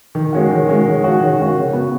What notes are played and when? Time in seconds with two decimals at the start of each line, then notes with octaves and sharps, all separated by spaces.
0.15 D#3
0.33 G#3 C#4 F#4
0.50 D#3
0.68 G#3 C#4 F#4
0.85 D#3
1.02 G#3 C#4 F#4
1.20 D#3
1.38 G#3 C#4 F#4
1.56 C#3
1.73 B3 F#4